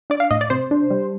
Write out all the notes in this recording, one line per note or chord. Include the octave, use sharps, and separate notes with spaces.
D4 D5
F5
A2 D#5
D5
C3 C5
D4
G3